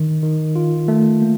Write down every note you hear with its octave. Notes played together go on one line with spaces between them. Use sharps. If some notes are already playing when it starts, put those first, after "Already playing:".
Already playing: D#3
D#3
F4
A3
A#3